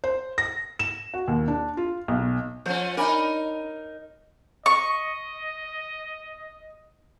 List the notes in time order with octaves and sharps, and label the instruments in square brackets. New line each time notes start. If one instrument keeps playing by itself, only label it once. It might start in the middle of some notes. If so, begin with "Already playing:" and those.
[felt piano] C5
A#6
E7
F#4
D#2
D4
F4
B1
[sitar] F3 C#4 [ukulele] C5
[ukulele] D4 G#5 B5 [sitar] D#4 A#4
[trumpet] D#5 [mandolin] C#6